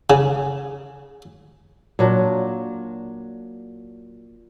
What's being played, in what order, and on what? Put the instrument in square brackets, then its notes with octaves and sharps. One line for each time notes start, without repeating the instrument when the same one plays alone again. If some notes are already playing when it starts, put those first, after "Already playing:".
[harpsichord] C#3
[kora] A#2 F#3 D4